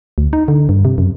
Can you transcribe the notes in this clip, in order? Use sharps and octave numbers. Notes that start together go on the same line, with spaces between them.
D2
D#4
D3
G2
C3
F#2